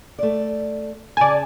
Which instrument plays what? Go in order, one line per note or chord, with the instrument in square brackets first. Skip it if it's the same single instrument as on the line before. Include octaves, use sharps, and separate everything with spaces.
[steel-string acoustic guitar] A3 D5
[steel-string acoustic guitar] C#3 A5 [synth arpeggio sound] D5 G#5